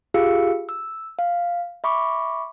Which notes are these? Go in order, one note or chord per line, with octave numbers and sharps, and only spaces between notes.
F4 G4 G#4 F5 E6 C#7
E6
F5
E5 B5 C#6 D6